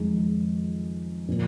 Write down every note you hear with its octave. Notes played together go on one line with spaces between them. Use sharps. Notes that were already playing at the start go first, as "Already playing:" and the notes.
Already playing: F2 D#3 G#3 D#4 G#4
A#2 F3 A#3